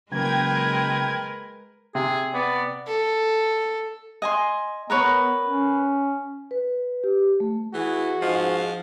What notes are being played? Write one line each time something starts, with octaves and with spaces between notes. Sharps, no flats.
C#3 F#3 G#3 A#3 A#4 B4 G5 G#6
C3 G#4
B3 D5
A4
D#5 G#5 C6
B3 A#4 B4 C#5
C#4
B4
G4
A3
E3 F#4 G#4
G#2 F3